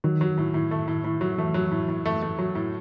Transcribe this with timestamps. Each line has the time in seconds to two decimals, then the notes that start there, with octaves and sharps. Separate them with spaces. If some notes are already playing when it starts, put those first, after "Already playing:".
0.04 D#3 F#3
0.21 F#3
0.38 A2
0.54 A2
0.71 A3
0.88 A2
1.04 A2
1.21 F#3
1.38 E3 A3
1.54 F#3
1.72 A2
1.88 A2
2.06 A3
2.22 A3
2.39 F#3
2.55 A2